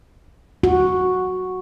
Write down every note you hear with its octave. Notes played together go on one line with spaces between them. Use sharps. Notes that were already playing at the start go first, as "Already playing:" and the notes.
F#4